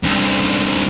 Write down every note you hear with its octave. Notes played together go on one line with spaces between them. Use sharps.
C2 D3